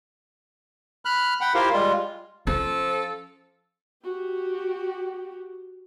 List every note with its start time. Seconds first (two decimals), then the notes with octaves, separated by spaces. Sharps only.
1.05 B5 F6 F#6
1.41 F#5 G5 B5
1.54 E4 F4 G4 A#4 C5 F5
1.73 G3 G#3 F4
2.47 F3 C#4 A4
4.04 F#4 G4